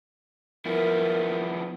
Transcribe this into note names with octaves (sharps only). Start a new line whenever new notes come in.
F3 B3 E4 A#4